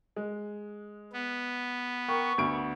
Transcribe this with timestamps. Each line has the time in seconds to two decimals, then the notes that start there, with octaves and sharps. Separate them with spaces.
0.16 G#3
1.13 B3
2.08 A#4 G5 C#6
2.38 D2 B3 D7